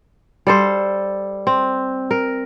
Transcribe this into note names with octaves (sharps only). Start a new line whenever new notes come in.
G3 A4 C5
C4
A#4